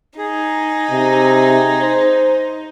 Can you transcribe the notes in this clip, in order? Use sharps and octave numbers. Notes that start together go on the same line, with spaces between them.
D#4 G#4
C3
C5